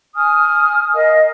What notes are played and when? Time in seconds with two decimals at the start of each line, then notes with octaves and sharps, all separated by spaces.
0.14 G#5 D#6 F6
0.93 A#4 D#5 F5